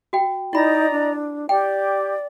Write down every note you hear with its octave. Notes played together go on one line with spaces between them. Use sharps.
F#4 G5
D#4 E4 D5 D#5 A#5 B5
D4
G4 D5 G5